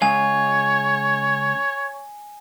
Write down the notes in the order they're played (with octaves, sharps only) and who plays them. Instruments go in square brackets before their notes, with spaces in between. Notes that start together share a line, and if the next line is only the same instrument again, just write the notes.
[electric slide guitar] C#3 G#3 F5 [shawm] C#5 [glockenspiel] G#5